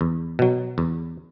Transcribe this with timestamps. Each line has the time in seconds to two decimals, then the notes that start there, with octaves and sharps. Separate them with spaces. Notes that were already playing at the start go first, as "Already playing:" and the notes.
0.01 E2
0.39 B2 F#3
0.78 E2